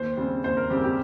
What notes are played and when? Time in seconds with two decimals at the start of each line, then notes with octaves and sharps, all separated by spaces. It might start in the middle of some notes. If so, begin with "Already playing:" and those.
Already playing: D#2 C5
0.17 C#3 G3 C4
0.44 D#2 C5
0.57 A#4
0.70 C#3 G3 C4 G4
0.84 G4